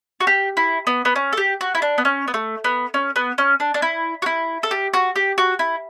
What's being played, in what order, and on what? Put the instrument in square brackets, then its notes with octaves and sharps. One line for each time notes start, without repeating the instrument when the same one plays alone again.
[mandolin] F#4
G4
E4
B3
B3
C#4
A4
G4
F#4
E4
D4
B3
C#4
B3
A3
B3
C#4
B3
C#4
D4
D4
E4
F#4
E4
A4
G4
F#4
G4
F#4
E4